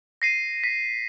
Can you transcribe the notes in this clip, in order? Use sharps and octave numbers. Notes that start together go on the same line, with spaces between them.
A#6 C7 D#7
B6